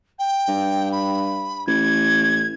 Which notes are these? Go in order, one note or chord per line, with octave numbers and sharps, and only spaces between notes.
G5
G2
B5
A1 G#6